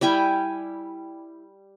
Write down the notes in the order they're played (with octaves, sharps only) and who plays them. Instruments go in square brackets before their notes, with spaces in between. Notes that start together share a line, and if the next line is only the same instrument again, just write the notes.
[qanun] G3 E4 G5 G#5